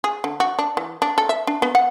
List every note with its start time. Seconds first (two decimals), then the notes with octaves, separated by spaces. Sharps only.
0.04 G#4
0.24 D3
0.40 F#4
0.59 D4
0.77 E3
1.02 D4
1.18 A4
1.29 E5
1.47 D4
1.62 B3
1.75 F#5